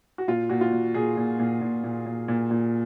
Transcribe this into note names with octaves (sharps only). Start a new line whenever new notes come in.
F#4
A#2 F4
A#2 F#4
F4
A#2
A#2 G#4
A#2
A#2
A#2
A#2
A#2
A#2
A#2